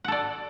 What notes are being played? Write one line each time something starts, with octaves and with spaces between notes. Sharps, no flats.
A4 D5 F#5